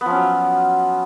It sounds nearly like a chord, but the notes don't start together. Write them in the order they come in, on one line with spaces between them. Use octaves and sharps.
B3 F3 C#4 F#3